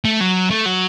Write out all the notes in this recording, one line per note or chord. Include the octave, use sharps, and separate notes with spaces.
A3
F#3
A3
F#3